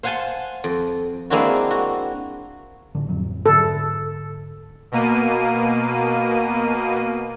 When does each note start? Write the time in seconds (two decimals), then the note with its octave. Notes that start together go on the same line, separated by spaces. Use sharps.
0.03 C5 F5 F#5 G#5 A5 C6
0.64 F2
1.30 G#3 A#3 C4 D4 E4 F#4
1.71 F#4
2.95 A1 D3
3.08 A1 F2 F#3
3.46 G#2 D3 A4
4.92 B2 A#3 D#7